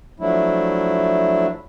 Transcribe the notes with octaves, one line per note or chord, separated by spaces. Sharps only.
F3 F#3 A3 D4 E4